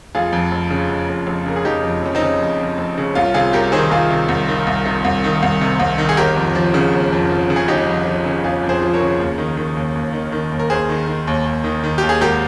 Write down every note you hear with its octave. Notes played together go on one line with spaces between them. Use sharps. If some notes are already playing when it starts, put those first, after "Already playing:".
F1 F4 G#4
F2
F1
C#3
F1
F2
F1
C#3 A#4
G#4
F1 D#4 G4
F2
F1 C#4
C4 D#4
C#3
F1
F2
F1
C#3
C2 C#4 F4
C3 F4 G#4
C2 G4 A#4
D#3 G#4 C5
C2 F4 G#4
C3
C2
D#3
C2
C3
C2
D#3
C2
C3
C2
D#3
G#4
G1 G4 A#4
F2
F3
C#3
G1
F2
F3
C#3
G#4
G1 D#4 G4
F2
F3
C#3
G1 F4 G#4
F2
G#4 C5
F3
A#4 C#5
C#3
D#2
D#3
D#3
D#2
D#2
D#3
D#3
D#2
A#4
D#2 G#4 C5
D#3
D#3
D#2
D#2
D#3
D#3
D#2 G4
G#4
G#1 G4 A#4